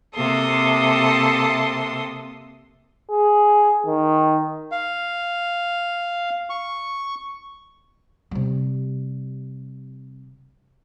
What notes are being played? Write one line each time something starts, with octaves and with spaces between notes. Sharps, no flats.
C3 A#3 A4 C6 D#6
G#4
D#3
F5
C#6
C3 G3